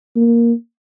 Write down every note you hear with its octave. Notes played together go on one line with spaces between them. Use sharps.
A#3